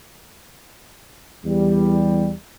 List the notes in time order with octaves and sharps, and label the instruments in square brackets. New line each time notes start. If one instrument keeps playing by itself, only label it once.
[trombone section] E2 G3